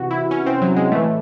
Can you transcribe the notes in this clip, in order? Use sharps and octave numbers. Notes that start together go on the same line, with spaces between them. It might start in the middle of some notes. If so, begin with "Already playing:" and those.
Already playing: C3 E3 F#4
E4
C#4
C4
F#3
G#3
A2 E3 A3